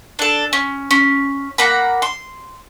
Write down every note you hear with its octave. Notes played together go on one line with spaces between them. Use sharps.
D4 A4
C#4
C#4
A#3 F#5 A#5 B5
C6